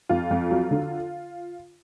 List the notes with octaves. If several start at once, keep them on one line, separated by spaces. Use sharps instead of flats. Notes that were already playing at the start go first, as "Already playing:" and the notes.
F2 F4
F2
F#3
D3